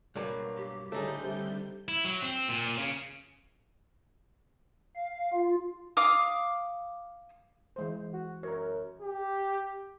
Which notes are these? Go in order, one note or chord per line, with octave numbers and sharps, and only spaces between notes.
G2 B2 F#3 A#3
G4
A2 D3 G3 A3 D#4 G#4 G6
C3
E4
F#3
C4
A#2
C#3
F5
F4
F5 D6 D#6
E3 G#3 C5
F#4
F#2 A#4 C#5
G4